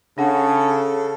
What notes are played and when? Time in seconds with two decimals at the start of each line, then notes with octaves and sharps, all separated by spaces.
0.18 C#3 D4 A4 F#5